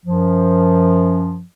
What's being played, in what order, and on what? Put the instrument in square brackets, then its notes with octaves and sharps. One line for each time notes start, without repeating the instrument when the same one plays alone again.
[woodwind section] F#2 F3